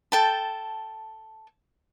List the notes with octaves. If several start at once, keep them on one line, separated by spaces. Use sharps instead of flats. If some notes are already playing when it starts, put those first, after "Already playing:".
A4 G5 A5